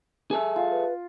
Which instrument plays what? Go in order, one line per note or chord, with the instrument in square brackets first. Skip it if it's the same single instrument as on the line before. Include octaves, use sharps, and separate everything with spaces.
[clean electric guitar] G#4 A4 E5 [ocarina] G#5
[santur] F4
[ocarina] B4